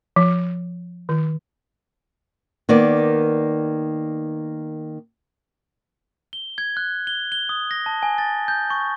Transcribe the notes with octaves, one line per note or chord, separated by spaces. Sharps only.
F3
D#3
D#3 A#3 B3 D5
G7
G#6
F#6
G7
G7
D#6
A#6
A5
G#5
A6
G6
C#6